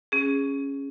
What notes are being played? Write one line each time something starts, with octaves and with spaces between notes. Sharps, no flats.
C#4 G#4